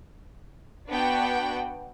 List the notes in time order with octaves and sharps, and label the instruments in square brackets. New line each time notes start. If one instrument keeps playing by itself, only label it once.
[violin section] B3 D4 F#4 F#5 G5